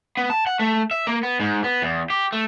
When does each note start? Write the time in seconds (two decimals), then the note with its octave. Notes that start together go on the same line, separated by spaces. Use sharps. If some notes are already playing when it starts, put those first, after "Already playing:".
0.17 B3
0.30 A5
0.47 F#5
0.59 A3
0.91 E5
1.07 A#3
1.23 B3
1.40 G#2
1.64 B3
1.82 E2
2.10 G4
2.32 A3